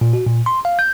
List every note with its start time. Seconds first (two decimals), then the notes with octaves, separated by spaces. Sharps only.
0.01 A#2
0.13 F#4
0.26 A#2
0.46 C6
0.65 F5
0.79 G6